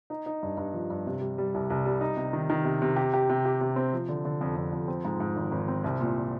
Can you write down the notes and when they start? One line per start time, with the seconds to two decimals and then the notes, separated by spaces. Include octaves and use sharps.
0.10 D#4
0.26 D#4
0.43 G2
0.57 G2
0.74 F3
0.90 G2
1.06 C3
1.21 G3
1.38 G3
1.54 C2
1.70 C2
1.86 G3
2.01 D#4
2.17 C3
2.33 D#3
2.50 D#3
2.65 C3
2.82 C3
2.96 G4
3.14 G4
3.30 C3
3.45 G4
3.61 C3
3.76 C4
3.93 F3
4.09 D3
4.25 D3
4.41 F2
4.56 F2
4.73 F2
4.88 C4
5.05 G#2
5.20 G#2
5.36 G#1
5.52 G#1
5.68 C4
5.84 C2
6.00 A#2